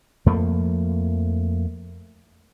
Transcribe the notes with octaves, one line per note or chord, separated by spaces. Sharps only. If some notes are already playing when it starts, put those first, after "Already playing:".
F2 F3 A3 A#3